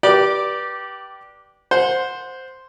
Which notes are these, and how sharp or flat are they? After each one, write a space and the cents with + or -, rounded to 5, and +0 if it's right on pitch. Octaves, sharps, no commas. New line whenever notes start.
G4 -15 B4 -25 D5 +0
C5 +0 F#5 -25